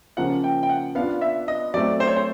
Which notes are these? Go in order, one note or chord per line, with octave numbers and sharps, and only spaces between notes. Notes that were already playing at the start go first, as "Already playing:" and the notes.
C#3 F3 A#3 C#4 F4 F#5
G5
G5
F#5
B3 D4 F4 F5
E5
D#5
F#3 A3 C4 D5
C5
C#5
C5